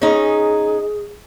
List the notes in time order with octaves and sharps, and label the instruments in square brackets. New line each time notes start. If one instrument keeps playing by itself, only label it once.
[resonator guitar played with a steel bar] C#4 D#4 [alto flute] G#4